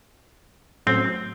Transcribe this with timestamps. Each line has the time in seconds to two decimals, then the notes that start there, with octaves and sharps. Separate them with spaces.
0.87 A2 F#3 C4 C#4 F#4